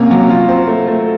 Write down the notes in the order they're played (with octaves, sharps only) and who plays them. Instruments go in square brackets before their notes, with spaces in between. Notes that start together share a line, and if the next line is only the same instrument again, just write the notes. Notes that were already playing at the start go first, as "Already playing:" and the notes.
Already playing: [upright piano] C3 A#3 C#4
F#3
F4
C4
A3
A3